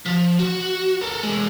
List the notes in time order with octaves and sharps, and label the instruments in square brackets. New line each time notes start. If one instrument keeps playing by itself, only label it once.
[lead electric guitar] F3
F#4
A4 A#4
E2 G#3